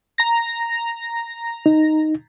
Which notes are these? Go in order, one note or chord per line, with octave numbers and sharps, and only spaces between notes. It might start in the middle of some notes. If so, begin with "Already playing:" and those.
A#5 A#6
D#4